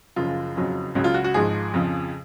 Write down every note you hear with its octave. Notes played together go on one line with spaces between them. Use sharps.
F#1 F#2 C#3 F3 F4
F#1 F2 C#3 F#3
C#2 C#3 F#3
F4
F#4
F#4
G#1 G#2 F3 G#4
F2 C#3 F3